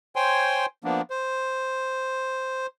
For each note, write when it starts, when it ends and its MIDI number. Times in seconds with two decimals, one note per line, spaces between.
0.16 0.66 72
0.16 0.66 73
0.16 0.66 79
0.16 0.66 80
0.16 0.66 84
0.84 1.02 53
0.84 1.02 58
0.84 1.02 59
0.84 1.02 62
1.10 2.67 72